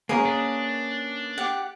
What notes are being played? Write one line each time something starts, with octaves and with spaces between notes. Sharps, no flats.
A#3 C#4 G#4 A#4 B4 D#5
D4
G4 F#5